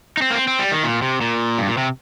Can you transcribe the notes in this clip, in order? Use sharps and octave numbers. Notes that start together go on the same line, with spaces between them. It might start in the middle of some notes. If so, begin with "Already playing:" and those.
D#4
C4
A#3
C4
C4
G3
D#3
A#2
C3
A#2
G2
A#2
C3